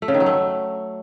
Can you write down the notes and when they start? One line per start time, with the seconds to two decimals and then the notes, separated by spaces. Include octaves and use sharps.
0.02 A3
0.08 C#3
0.14 D#3
0.20 F#3
0.26 A3